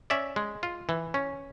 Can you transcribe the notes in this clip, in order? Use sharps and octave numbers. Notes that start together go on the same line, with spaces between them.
C#4 D5 E5
G#3
F4
E3
C#4